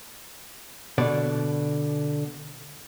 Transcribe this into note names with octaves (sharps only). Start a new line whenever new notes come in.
B2 D3 D5